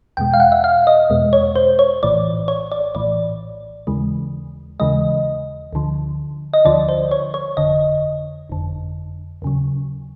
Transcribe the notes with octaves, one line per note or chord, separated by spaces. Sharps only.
E2 B2 G#3 G5
F5
F#5
E5
F5
D#5
E2 B2 G#3
C#5
C5
C#5
A#1 A2 E3 D5
C#5
D5
A#1 A2 E3 D5
D#2 C#3 E3 G#3
D#2 C#3 E3 G#3 D#5
D2 D3 F3
D#5
D2 D3 F3 D5
C5
C#5
C#5
G1 F2 D3 D#5
G1 F2 D3
D#2 C#3 F#3